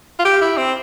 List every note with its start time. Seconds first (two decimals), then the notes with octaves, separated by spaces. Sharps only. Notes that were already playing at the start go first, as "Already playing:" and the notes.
0.19 F4
0.25 G4
0.42 E4
0.58 C4